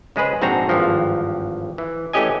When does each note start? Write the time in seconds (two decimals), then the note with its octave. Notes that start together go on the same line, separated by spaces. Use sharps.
0.16 C#3 G#3 G#4 B4 C5
0.42 A#1 G#2 C4 D4 F#4 A#5
0.69 G#1 G2 E3 F3
1.78 E3
2.13 E3 A3 C#4 G4 D#5 G#5